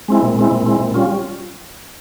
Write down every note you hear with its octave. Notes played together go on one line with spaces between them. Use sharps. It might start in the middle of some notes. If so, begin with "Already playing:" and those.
G#3 C4 E4
A#2
G#3 C4 E4
A#2
G#3 C4 E4
A#2
G3 C#4 F4